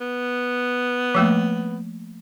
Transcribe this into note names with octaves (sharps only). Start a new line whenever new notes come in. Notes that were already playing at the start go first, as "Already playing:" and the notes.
B3
F3 A3 A#3